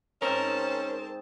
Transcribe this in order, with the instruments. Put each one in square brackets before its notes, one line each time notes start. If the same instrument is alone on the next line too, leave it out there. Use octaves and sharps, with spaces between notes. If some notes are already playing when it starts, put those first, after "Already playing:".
[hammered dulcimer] G#2 C4 D#4 [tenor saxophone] C#4 [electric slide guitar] A#4 [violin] C5 A5